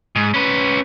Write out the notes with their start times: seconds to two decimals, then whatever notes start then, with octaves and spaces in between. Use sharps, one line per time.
0.16 G#2
0.34 C#4 B4